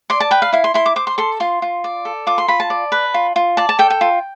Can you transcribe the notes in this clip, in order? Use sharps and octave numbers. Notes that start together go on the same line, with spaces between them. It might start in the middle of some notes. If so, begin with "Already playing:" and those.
D5 C6
A5
B4 G5
F5
E4 F5
C6
E4 C6
D6
C5 D6
C6
A4 C6
F4 C6
F4
D5
A4
F4 D6
C6
F4 B5
A5
D5
B4
F4
F4
D5 A5
A5
A4 G5
G5
F4